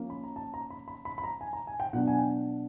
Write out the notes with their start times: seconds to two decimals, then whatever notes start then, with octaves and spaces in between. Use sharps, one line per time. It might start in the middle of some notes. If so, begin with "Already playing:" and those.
Already playing: F3 A#3 C#4
0.10 B5
0.24 A#5
0.36 A5
0.54 A#5
0.70 B5
0.88 B5
1.05 B5
1.18 B5
1.24 A#5
1.41 G#5
1.53 A#5
1.67 G#5
1.80 G5
1.93 B2 F#3 B3 D4 F#5
2.08 G#5
2.18 G5